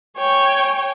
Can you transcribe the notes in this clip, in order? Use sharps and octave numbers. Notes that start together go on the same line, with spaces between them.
C#5 G5 G#5